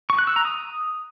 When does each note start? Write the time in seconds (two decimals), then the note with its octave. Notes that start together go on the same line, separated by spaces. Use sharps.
0.10 C#6
0.19 F#6
0.27 E6
0.36 A#5
0.45 D#6